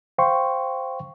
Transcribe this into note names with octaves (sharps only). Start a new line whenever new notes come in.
C5 F5 G5 C6 C#6